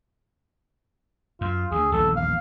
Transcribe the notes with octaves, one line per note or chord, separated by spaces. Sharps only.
F#2 F4
D2 G#4
D#1 A#1 E2 A4
F5